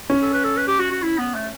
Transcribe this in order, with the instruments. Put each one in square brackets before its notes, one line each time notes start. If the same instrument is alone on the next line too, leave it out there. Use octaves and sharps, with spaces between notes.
[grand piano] C#4
[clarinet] A4
B4
A4
B4
G4
F#4
F#4
E4
B3
A3